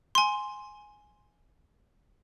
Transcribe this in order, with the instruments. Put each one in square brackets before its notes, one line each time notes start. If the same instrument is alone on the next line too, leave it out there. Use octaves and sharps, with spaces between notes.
[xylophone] G#5 C6